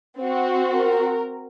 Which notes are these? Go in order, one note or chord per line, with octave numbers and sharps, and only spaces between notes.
C4 F#4
A#4